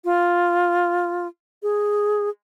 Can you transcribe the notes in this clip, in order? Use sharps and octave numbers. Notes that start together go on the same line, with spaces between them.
F4
G#4